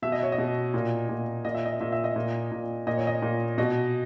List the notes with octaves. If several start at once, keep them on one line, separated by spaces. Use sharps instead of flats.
B2 E5
D#5
C#5
D#5
B2
A#2
A#2
A#2 D#5
E5
D#5
A#2 E5
E5
D#5
A#2
A#2
A#2 D#5
C#5
D#5
A#2
B2 D#5